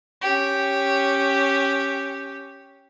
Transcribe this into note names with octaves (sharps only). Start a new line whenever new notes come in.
C#4 G4